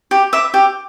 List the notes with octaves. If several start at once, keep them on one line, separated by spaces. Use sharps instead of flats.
G4
E5 B5 D6
G4